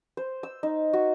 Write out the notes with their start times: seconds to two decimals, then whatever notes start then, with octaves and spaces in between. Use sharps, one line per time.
0.17 C5
0.43 E6
0.63 D#4
0.93 F#4